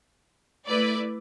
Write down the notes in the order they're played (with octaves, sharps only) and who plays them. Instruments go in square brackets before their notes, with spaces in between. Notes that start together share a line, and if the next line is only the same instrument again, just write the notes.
[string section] A3 E4 B4 D5